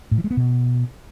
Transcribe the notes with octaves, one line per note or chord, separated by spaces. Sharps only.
A2
E3
G#3
B3
B2